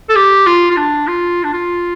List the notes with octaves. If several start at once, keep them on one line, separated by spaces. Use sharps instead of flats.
A4
G4
F4
F4
D4
F4
D4
F4